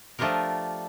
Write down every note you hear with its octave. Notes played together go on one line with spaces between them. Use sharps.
F3 A3 D4 F4 G4 A#4